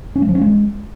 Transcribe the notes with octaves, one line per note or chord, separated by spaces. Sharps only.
C#4
G#3
F3
C#4
G#3